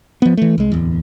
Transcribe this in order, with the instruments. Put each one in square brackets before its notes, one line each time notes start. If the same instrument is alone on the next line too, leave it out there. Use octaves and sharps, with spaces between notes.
[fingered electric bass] F3 B3
E3 A3
C2 G#3
D1 E2